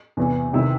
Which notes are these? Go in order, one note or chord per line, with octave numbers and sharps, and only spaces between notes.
E2 C3 E3
C3 D#3 E4